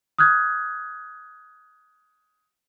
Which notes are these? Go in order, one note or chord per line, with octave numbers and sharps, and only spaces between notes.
D#6 F6 F#6 G#6